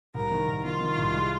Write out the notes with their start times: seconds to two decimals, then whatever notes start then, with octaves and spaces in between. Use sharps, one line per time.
0.14 C2 A#4
0.31 D#3
0.47 C2
0.64 D#3 F4
0.81 D#3
0.98 C2
1.14 G#3